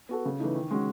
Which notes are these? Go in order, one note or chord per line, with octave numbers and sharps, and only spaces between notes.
B3 F#4 A4
C#3
E3 A3 D#4
D#3
G#3 C#4 F#4